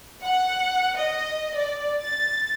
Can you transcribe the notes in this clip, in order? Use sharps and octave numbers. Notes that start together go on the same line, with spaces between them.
F#5
D#5
D5
A6